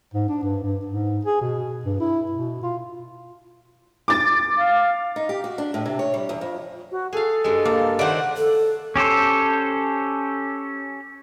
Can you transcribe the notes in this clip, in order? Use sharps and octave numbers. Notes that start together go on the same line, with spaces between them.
G#2
D4
G2
G2
G#2
G#4
B2
G2
E4
B2
F4
D6 A6
F5
D#4
G4
F#4
D4
A2
C3
C#5
G3
E2
F2
F#4
G#4 A4 F5
G2 G#3
A#3
D#3 A3 C5 D5 F#5
A4
C#4 G4 A4 C5